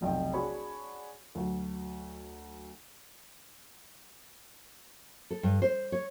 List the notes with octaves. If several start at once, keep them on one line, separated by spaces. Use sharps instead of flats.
F1 B1 C3 D#5 G5
D4 F#4 G#4 C#5 B5
D2 F#3
A4
G2
C5
C#5